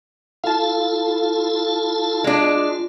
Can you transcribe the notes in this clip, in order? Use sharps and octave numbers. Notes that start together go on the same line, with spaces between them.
E4 F4 A4 F5 A5
G#3 D4 F4